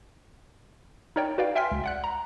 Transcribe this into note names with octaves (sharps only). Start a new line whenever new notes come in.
D#4 A#4 C#5 D5 G5
F#4 B4 D5 F5 G5
E5 G5 G#5 C6 F6 B6
C#2
D5 F#5 F#6
A#5